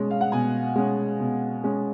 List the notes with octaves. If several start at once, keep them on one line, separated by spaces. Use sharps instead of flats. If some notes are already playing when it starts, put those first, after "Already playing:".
Already playing: B2 G#3 C#4
F5
F#5
B2 G#5
G#3 C#4
B2
G#3 C#4